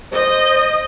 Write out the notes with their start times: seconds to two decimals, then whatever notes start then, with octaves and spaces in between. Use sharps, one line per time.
0.12 C5 D#5